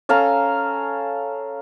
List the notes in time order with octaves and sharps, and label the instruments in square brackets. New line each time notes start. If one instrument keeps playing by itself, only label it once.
[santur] C#4 A4 F5 A#5